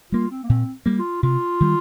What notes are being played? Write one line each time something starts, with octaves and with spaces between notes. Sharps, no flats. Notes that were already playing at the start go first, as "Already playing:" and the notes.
G3 A#3 F4
C4
A#3
A#2 C4
G3 A#3
F4
C3 F4
D#3 G3